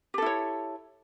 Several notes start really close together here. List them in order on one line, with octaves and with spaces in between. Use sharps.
G4 A4 E4 C#5